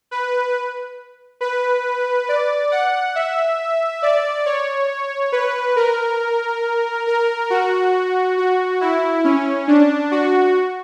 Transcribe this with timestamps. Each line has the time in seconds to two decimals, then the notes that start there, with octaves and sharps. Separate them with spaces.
0.11 B4
1.41 B4
2.29 D5
2.71 F#5
3.15 E5
4.02 D5
4.46 C#5
5.32 B4
5.76 A#4
7.07 A#4
7.50 F#4
8.37 F#4
8.81 E4
9.24 C#4
9.68 D4
10.11 F#4